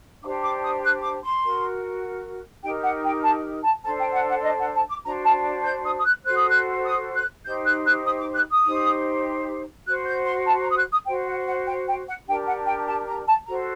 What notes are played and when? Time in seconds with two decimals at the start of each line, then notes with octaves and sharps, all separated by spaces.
0.22 D4 G4 C5 D6
0.43 D6
0.63 D#6
0.83 F#6
1.02 D6
1.23 C6
1.43 F#4 A#4
2.63 D#4 G4 A#4 G5
2.83 F#5
3.04 G5
3.24 A5
3.63 A5
3.83 D4 A4 C5 A5
3.98 G5
4.14 F#5
4.29 F#5
4.43 D#5
4.59 F#5
4.74 A5
4.89 D6
5.04 D4 F#4 C5 A#5
5.24 A5
5.64 G6
5.85 D#6
5.99 D#6
6.05 F#6
6.25 F#4 A4 C5 F#6
6.36 D#6
6.48 F#6
6.85 D#6
7.15 F#6
7.45 D#4 G4 C5 G6
7.65 F#6
7.86 F#6
8.06 D#6
8.20 D6
8.35 F#6
8.50 D#6
8.65 D#4 G4 C5
9.86 F#4 F#6
9.89 C5
10.06 G6
10.26 C6
10.47 A5
10.61 A#5
10.70 D#6
10.77 F#6
10.92 D#6
11.06 F#4 C5 G5
11.27 F#5
11.46 F#5
11.66 G5
11.87 G5
12.07 F#5
12.27 D4 G4 A#4 G5
12.47 F#5
12.66 G5
12.87 A5
13.07 A#5
13.27 A5
13.46 F#4 A4 C5 A#5